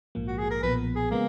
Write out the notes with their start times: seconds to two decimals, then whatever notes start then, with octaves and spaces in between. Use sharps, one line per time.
0.15 A#1 G#2 F3 A#3
0.27 F#4
0.38 G#4
0.51 A#4
0.63 B1 A#2 F3 B3 B4
0.96 G#4
1.11 C#3 G#3 A#3 B3